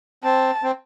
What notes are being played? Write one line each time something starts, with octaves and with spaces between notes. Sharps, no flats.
C4 A5
C4